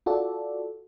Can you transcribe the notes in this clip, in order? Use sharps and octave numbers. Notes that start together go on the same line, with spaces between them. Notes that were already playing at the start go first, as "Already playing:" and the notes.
F4 F#4 A4 D5